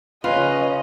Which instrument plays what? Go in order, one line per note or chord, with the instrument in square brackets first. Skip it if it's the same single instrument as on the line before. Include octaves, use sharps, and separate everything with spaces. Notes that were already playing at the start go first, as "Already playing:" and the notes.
[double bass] C#3 C#4 [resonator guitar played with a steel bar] F4 [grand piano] B4 [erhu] D#5